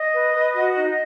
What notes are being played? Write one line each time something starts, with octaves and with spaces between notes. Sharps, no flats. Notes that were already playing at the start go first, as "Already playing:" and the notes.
Already playing: D#5
B4
B4
F#4
D#4